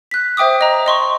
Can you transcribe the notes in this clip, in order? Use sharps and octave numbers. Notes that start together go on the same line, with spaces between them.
F#6 B6
C5 E5 G5 D6 D#6
D#5 A#5
D#5 C6 C#6